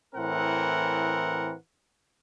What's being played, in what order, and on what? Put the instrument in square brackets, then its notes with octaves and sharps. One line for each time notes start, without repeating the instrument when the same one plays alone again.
[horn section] A2 E3 C4 A#4 F#5